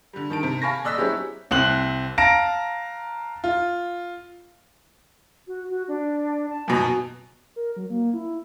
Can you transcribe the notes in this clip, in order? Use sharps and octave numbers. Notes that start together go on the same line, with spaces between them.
D3 G3
D#3 A5 D7
C3
F5 G#5 A5 B5 C#6 A#6
D#1 D5 D#5 E6 F#6 B6
F#3 C4 C#4 E4 G4 G#4
C2 C4 F#6 F#7
F5 A5 A#5 A#6 D7
F4
F#4
F#4
D4
A5
F#2 B2
A#4
F#3
A#3
E4